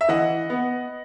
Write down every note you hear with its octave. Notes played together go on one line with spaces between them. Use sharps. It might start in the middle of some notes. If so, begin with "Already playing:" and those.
E5
E3 D#5 F#5
B3